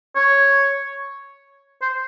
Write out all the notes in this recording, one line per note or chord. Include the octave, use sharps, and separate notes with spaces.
C#5
C5